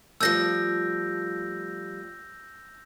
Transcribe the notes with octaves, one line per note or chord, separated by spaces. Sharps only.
F3 G3 A3 E6 G6 A#6